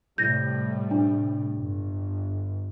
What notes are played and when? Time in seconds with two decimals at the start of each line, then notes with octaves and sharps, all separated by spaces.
0.18 A2 C3 G3 G6 A#6
0.91 D4
1.55 G1